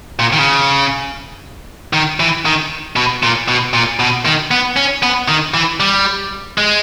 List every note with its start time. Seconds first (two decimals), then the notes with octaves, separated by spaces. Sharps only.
0.19 A#2
0.33 D#3
0.38 C#3
1.93 D#3
2.20 E3
2.45 D#3
2.96 B2
3.23 A#2
3.48 B2
3.73 A#2
3.99 B2
4.25 D#3
4.51 B3
4.76 C#4
5.03 B3
5.28 D#3
5.54 E3
5.80 G3
6.58 G#3